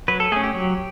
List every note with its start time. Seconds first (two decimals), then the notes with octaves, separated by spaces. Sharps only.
0.08 F#3 B4
0.20 A4
0.32 A3 C#4 G#4
0.44 G4
0.54 F#3